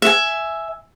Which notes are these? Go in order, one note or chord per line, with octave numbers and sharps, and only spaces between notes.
E5 G#5